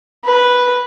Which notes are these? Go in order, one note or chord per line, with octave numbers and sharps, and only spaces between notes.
B4